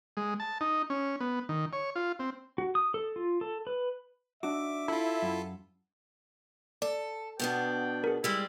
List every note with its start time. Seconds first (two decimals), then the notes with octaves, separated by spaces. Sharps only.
0.17 G#3
0.40 A5
0.61 D#4
0.90 C#4
1.20 B3
1.49 D#3
1.73 C#5
1.96 F4
2.19 C4
2.58 F#4
2.75 D#6
2.94 A4
3.16 F4
3.41 A4
3.67 B4
4.43 D4 D#4 F#4 E5 D6
4.88 E4 F4 A4
5.22 F#2
6.82 A4 D5
7.40 B2 B3 D4 G5
8.04 G#4 A#4
8.24 G3 G#3 E4